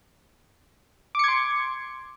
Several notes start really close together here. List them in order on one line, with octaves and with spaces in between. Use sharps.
D6 C#7 G#6 C6